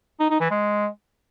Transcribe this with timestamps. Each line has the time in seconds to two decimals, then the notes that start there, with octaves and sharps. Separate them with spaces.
0.20 D#4
0.30 D#4
0.41 E3
0.51 G#3